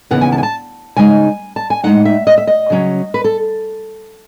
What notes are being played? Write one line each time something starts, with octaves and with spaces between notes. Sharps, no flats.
D#2 C#3 E3 B3 F#5
G#5
A5
G#5
A5
C#3 G#3 D#4 G#5
A5
G#5
A2 G#3 D#4 F#5
E5
D#5
E5
D#5
C#3 F#3 C#4
B4
A4